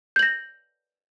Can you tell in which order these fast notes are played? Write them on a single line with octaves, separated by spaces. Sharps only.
G6 F#7 A#6